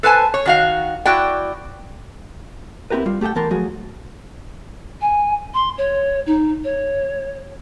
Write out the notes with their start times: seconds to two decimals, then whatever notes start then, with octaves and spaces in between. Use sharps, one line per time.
0.03 A4 B4 C5 G#5 A5
0.34 C#5
0.46 D#3 F#4 F5
1.05 E4 F#4 D5 G5
2.90 B3 C4 E4 G4 A#4 B4
3.06 G3 F4
3.21 A3 G4 A4 F#5 G5
3.35 E3 B3 A#4 A5 C6
3.51 F3 F#3 A3 F#4 G#4
5.01 G#5
5.54 C6
5.78 C#5
6.26 D#4
6.64 C#5